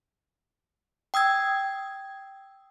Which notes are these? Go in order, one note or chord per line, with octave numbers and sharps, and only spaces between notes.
G5 D#6 E6 G#6